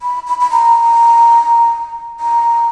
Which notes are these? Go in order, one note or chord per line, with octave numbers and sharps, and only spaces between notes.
B5
B5
B5
A#5
A#5